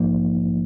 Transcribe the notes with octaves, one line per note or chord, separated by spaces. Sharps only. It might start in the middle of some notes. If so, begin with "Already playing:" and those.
Already playing: A#1 G#2 F3 A#3 D#4